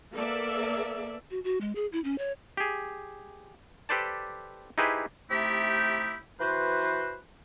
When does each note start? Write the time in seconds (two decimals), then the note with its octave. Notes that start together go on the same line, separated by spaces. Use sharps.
0.13 A#3 B3 A4 D5 E5
1.31 F#4
1.44 F#4
1.61 G#3
1.75 G#4
1.92 E4
2.04 C#4
2.18 C#5
2.57 G4 G#4
3.89 G4 A4 B4 C5 D5 A5
4.78 D#4 E4 G4 G#4 B4 C5
5.31 C3 A3 D#4 E4 G4
6.40 E3 F#4 B4 C5